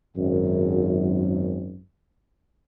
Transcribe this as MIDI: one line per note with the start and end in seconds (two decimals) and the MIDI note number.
0.17 1.81 32
0.17 1.81 42